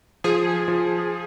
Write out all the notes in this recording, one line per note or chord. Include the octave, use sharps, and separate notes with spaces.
F3 G#4
F3